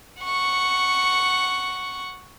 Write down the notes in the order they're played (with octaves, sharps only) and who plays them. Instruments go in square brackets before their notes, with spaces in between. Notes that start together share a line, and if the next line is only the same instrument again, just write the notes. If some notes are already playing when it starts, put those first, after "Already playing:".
[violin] F#5 C#6